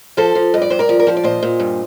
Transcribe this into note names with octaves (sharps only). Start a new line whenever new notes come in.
F3 A4 C5
F3
G2 D#5
D5
G2 C5
A#4 D5
F3
A#4
F3 C5
D5
A#2 C5 D#5
A#2
G2